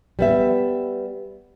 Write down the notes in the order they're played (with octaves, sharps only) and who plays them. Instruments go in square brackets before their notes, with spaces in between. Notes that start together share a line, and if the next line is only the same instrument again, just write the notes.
[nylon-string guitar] G3 B3 E5